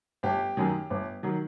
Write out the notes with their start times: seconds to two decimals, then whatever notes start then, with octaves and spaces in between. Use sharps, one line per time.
0.23 G1 G4
0.57 F#2 D#3 F#3
0.90 G1
1.23 D#3 F#3